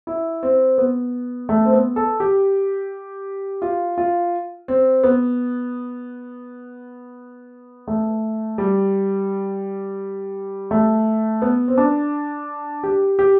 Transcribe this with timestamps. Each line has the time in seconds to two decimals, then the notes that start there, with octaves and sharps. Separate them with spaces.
0.07 E4
0.43 C4
0.78 B3
1.49 A3
1.66 C4
1.73 B3
1.96 A4
2.20 G4
3.62 F4
3.98 F4
4.68 C4
5.04 B3
7.88 A3
8.58 G3
10.71 A3
11.42 B3
11.68 C4
11.78 D4
12.83 G4
13.19 G4